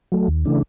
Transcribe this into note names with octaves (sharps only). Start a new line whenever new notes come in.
F#3 A3
D#2
C#3 E3 A3 D4